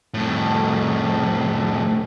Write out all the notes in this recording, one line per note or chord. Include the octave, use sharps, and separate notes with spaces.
F2 A2